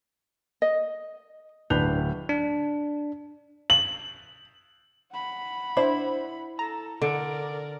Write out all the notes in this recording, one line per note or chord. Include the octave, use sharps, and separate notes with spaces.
D#5
D1 D4 B4 G6 F7
D4
F#7
F#5 B5
D4 E4 C5
A4 A#5
D3 A#4 D5